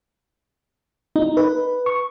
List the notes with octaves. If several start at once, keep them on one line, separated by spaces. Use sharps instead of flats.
D#4
B4
C#6